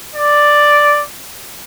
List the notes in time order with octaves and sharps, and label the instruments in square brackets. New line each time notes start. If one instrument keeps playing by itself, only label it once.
[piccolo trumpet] D5